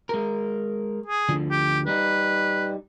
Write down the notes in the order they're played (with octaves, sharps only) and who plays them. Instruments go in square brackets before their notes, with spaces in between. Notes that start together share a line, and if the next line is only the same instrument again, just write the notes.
[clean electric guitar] G#3 A#4
[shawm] G#4
[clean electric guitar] D2 D3 F3
[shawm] G4
[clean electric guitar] G3 D#4 [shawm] B4